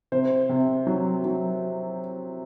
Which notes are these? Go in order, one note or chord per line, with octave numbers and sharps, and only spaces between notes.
C3 C5
C3
F#3
F#3